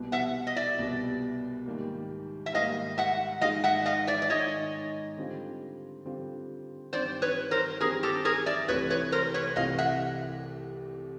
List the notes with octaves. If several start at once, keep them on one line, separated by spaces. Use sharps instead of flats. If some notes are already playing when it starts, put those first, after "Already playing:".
Already playing: C2 B2 G3 B3
E5 F#5
D#5
D5 E5
C2 B2 G3 B3
G#2 D#3 G3 A#3
E5
G#2 D#3 G3 A#3 D#5 F5
E5 F#5
G#2 D#3 G#3 D#5 F5
E5 F#5
D#5 F5
D5 E5
D5
G#2 D#3 G#3 C#5 D#5
D3 G3 C4 F4
D3 G3 C4 F4
G2 D#3 G3 C4 C5 D5
B4 C#5
A#4 C5
G2 D#3 G3 C4 G#4 A#4
G4 A4
G#4 A#4
D5 E5
C2 C3 E3 A3 B4 C#5
B4 C#5
A#4 C5
B4 C#5
C2 C3 E3 A3 D#5 F5
E5 F#5